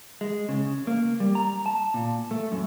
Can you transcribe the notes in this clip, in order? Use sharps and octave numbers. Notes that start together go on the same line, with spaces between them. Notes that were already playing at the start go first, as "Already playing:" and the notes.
G#3
C#3
A#3
G3
A#5
A5
A#2
A3
F#2